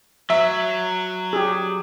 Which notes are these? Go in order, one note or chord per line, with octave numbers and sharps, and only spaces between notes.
F#3 E5
G4 G#4